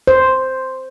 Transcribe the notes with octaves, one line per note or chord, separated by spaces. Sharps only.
C5